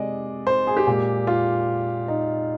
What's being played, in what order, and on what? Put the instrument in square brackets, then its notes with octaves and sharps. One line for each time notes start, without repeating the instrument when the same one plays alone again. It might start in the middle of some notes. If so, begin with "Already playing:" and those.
Already playing: [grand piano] C3 G#3 D5 D#5
C5
G#4
G4
A#2 G#3
F4
D#4